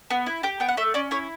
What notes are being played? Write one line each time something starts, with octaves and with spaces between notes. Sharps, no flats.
B3
E4
G4 G5
B3 G5
F#5
A3 E5
C#4 D5
E4 C#5